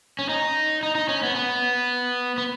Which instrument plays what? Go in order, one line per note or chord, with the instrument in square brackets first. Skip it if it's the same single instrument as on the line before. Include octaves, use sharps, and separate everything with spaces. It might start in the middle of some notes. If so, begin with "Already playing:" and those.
[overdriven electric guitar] C#4
D#4
D#4
D#4
C#4
B3
B3
B3